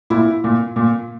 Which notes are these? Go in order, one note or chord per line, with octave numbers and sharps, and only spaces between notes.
A#2 E4
A#2
A#2